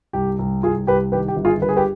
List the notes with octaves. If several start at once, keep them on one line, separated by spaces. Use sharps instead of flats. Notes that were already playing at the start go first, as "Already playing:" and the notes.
C2 G4
C2
C2 F4 G#4
C2 G4 B4
D#3 G4 B4
G4
G1
F4 G#4
G1 B4
G#4
G4 B4